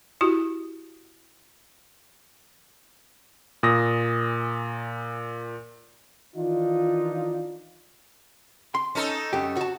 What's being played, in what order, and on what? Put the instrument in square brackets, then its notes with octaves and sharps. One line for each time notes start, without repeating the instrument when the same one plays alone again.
[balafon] E4 F#4 G4
[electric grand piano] A#2 D#6 A#6
[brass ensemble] D#3 E3 D4 D#4 F4
[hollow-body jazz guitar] C6
[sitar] C#4 D#4 A4
[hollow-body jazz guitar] F#2 G4
F#4 A5